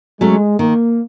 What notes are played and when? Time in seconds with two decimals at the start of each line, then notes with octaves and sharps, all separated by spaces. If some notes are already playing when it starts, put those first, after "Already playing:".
0.21 F#3 G#3 A3 C#4
0.59 D#3 A#3